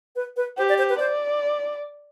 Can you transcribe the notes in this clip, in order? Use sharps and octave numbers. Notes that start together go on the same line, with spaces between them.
B4
B4
G4 C5
D5
C5
B4
C5 D5